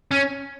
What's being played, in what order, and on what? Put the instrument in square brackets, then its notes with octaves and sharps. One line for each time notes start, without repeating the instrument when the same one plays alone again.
[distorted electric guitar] C#4